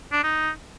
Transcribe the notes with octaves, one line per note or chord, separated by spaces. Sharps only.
D4
D#4